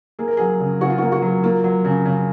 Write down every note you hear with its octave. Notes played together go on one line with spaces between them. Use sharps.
A#3 G#4
A#4
F#3 G#4
C#3
C#3 F#4
F4
A#3 F#4
F#4
F#3
A#3 F4
F#3
C#3
C#3